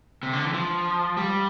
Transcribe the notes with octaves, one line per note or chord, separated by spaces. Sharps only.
C3
D3
E3
F3
G3